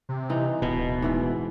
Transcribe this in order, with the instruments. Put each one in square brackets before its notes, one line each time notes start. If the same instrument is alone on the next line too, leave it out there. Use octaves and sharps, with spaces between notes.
[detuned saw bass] C3
[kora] E3 D#4
[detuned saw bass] D1 [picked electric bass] B2
[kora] G#2 E3 E4